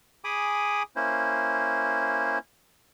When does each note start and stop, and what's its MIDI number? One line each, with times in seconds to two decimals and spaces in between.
0.24 0.83 68
0.24 0.83 80
0.24 0.83 83
0.24 0.83 86
0.24 0.83 87
0.96 2.38 58
0.96 2.38 61
0.96 2.38 64
0.96 2.38 72